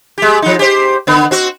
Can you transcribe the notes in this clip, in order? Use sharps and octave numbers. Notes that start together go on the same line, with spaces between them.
G#3 G4
F3 D#4
G4 C5
D3 B3
C4 F#4